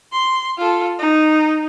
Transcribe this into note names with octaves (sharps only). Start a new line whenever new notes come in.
C6
F4 A4
D#4